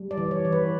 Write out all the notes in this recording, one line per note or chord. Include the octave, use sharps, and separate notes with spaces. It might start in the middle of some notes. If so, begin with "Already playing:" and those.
Already playing: G3
D5
E3
C#5
E3
B4